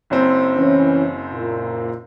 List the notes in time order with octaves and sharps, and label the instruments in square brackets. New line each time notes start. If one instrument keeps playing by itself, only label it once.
[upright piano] F#1 F#2 C4
[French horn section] E3 C#4
A#2